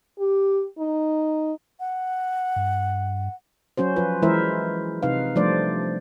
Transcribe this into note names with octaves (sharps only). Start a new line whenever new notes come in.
G4
D#4
F#5
G2
F#3 C#4 F#4 C5
F3 F4 B4
E3 G#3 E4 A#4 C5 E5
C3 D#4 B4 F5
F3 G3 A3 D4 C5 D5